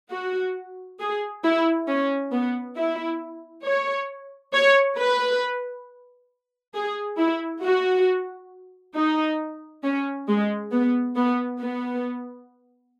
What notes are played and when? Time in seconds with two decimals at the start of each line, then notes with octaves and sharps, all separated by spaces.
0.11 F#4
1.00 G#4
1.44 E4
1.88 C#4
2.32 B3
2.76 E4
3.65 C#5
4.53 C#5
4.98 B4
6.75 G#4
7.18 E4
7.63 F#4
8.96 D#4
9.83 C#4
10.28 G#3
10.72 B3
11.17 B3
11.61 B3